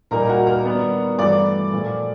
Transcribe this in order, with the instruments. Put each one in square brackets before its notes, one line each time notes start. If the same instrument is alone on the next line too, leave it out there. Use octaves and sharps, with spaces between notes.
[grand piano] A#2 G3 A#3 D#4 [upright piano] A#4 A#5
[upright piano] F#4 F#5
A#4 A#5
[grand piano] D#3 G3 B3 D4
[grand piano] G2 E3 A3 [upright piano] D5 D6
[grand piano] A#2 F3 A3